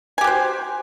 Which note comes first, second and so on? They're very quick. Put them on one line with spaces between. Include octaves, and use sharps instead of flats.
G#5 G4 F#4 C5